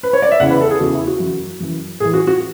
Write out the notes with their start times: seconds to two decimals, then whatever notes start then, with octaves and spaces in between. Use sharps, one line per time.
0.03 B4
0.13 C#5
0.22 D5
0.31 E5
0.40 E2 C#3 E3 F#5
0.50 B4
0.61 A4
0.70 G#4
0.80 E2 C#3 E3 F#4
0.94 E4
1.07 F#4
1.20 F#2 E3
1.60 F#2 E3
2.00 A2 E3 G#4
2.14 F#4
2.27 F#4